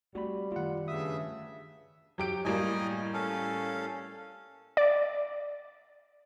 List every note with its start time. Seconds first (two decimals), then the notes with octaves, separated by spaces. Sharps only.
0.15 G3 A3 C4 F#4 D5 B5
0.52 D#3 A3 F4 F#5
0.88 G2 C#3 E5 D#6
2.18 F#3 G4 D7
2.45 A2 G3 A#3 D#5 G#5
3.14 C#4 A4 F5
4.77 D5